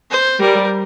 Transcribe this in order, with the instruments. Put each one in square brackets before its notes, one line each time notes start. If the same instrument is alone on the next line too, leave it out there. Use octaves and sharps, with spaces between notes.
[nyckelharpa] C5
[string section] G3 [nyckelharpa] A#4